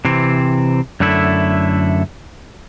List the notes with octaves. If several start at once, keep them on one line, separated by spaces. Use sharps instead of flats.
C3 E3 C4
F#2 D3 A3 E4